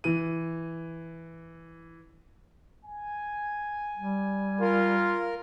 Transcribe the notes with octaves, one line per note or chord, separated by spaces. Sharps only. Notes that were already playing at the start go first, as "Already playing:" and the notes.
E3 D#7
G#5
G3
F4 A#4